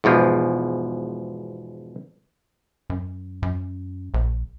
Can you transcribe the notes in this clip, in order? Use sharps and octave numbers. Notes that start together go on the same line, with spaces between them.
E2 G#2 B2 F3
F#2
F#2
A#1